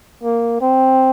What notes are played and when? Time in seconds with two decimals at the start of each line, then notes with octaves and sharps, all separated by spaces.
0.24 A#3
0.61 C4